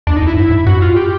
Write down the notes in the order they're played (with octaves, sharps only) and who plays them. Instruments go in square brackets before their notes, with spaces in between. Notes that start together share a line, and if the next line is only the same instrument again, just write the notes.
[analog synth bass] E2 [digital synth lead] D4
[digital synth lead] D#4
[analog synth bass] F2
[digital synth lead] E4
[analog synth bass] G2
G#2
[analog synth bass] F#2 [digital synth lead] F#4
[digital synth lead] F4
G4